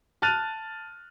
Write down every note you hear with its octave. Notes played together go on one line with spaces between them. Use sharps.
A5 F6 F#6 A6 D#7 F7